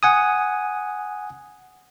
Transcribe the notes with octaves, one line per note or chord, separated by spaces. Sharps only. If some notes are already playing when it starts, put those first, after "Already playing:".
F#5 G#5 D#6